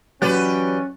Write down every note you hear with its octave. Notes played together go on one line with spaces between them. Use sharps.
E3 F#3 C#4 G4 B4 D5 F#5